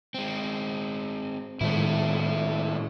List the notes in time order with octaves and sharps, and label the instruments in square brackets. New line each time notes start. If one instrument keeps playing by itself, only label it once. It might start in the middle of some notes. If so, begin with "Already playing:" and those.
[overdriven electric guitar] G#3 C4
[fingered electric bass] A2 D#3 G#3 [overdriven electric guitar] A3 E4